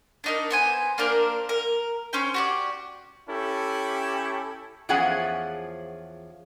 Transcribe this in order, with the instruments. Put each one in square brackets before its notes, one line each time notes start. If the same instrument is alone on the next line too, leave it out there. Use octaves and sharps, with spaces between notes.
[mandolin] D4 D#4 A#4
B3 C5 G#5
A#3 D4 A#4 C5
A#4
C#4 C5 G5
F#4 G4 D5
[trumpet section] C#4 E4 G4 A4
[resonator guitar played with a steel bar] E2 F3 C#4 G#4 F#5 G#5